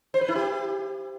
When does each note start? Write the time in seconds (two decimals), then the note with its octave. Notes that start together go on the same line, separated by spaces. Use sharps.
0.14 C5
0.21 B4
0.28 E4
0.36 G4